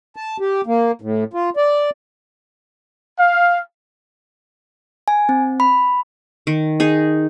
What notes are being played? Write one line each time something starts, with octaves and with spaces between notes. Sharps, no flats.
A5
G4
A#3
A2
F4
D5
F5
G#5
C4
B5
D#3
D#4 G#4